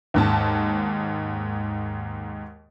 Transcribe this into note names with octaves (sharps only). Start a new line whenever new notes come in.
D#2 G#2 A5